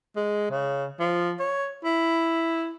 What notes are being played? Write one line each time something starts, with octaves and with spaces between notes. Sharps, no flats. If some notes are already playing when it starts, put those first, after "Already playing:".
G#3
C#3
F3
C#5
E4